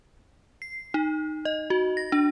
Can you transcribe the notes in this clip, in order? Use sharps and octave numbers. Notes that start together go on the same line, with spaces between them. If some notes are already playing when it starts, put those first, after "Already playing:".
C7
D#4
D#5
F#4
A#6
D4